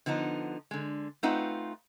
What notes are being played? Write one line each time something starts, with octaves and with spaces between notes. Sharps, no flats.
D3 F3 B3 D#4
D3 G#3
A3 C4 D#4 F4 B4 F#5